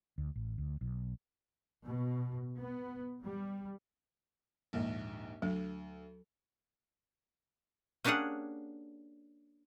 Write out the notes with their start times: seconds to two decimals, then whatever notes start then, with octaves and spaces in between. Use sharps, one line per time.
0.18 D2
0.36 A1
0.58 D2
0.81 B1
1.83 B2
2.58 B3
3.24 G3
4.73 A#1 D#2 G#2
5.42 D2 F#3
8.04 A#3 C#4 D4 G4 G#4 F#5